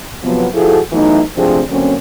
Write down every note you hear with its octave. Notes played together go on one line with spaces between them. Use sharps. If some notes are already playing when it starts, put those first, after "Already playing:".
C3 F3 F#3 B3
F3 E4 F#4 G#4 A4
E3 F#3 A3 B3 D#4
C3 F3 A3 C4 D4 G#4
D3 F#3 A#3 C4 C#4